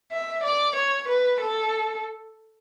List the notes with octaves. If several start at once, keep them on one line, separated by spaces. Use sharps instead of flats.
E5
D5
C#5
B4
A4